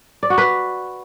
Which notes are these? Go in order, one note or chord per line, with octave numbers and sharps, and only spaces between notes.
D5
F#4
B4